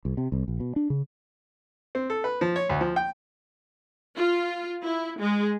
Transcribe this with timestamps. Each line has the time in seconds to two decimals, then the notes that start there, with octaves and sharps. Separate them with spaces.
0.05 C2
0.17 C3
0.32 C2
0.48 A#1
0.60 B2
0.76 D4
0.90 C#3
1.95 C4
2.10 A4
2.24 B4
2.41 F3
2.56 C#5
2.69 D2
2.81 F3
2.96 G5
4.15 F4
4.83 E4
5.18 G#3